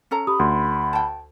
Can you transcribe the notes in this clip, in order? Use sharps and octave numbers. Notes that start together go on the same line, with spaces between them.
C#4 A4 A#5
G4 B5 D#6
D2 C6
G5 A5